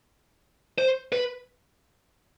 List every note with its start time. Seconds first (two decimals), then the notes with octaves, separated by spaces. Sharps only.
0.78 C5
1.12 B4